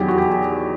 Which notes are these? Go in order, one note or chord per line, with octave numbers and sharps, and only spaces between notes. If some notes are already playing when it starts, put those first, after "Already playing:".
Already playing: E2 D#3 F#3 G4
F#4
G4